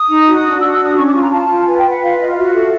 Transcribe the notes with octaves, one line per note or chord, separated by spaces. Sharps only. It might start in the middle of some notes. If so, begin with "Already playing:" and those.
Already playing: D#6
D#4
F#4
D4
F#4 E6
E6
D4
D#6
C#4 C#6
D6
F4 C#6
A#5
F4 A5
F4
B4 G#5
G5
B4
F#5
F4 F5
F4 D#5
F5
F#4 E5
A4